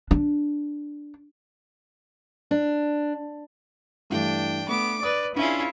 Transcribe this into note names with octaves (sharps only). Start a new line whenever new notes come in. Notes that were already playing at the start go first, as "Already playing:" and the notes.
D4
D4
G2 E3 A3 D4 G5
A3 B3 D6
B4 D5 D#6
C#4 D4 E4 F4 G#4 E5